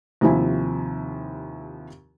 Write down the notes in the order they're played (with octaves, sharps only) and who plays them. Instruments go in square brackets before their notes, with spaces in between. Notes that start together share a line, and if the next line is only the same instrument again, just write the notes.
[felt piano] D#2 C3 F3 E4 G#5